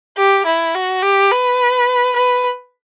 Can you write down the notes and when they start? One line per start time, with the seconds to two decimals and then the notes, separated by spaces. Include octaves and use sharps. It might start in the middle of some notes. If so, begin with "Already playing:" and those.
0.17 G4
0.46 E4
0.75 F#4
1.02 G4
1.31 B4
2.16 B4